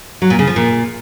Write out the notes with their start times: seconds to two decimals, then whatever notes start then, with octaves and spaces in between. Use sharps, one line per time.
0.22 F#3
0.30 A#2
0.39 C#3
0.47 F3
0.56 A#2